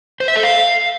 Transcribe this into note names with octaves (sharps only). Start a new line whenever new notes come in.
C5
E5
A4
F5